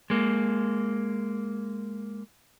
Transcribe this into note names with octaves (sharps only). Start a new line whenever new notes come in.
G#3 A#3